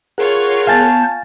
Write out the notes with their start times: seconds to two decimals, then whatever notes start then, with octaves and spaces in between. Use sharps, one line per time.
0.18 F4 G#4 A#4 C#5 F#5
0.67 B3 F5 G#5 A5 G6 A6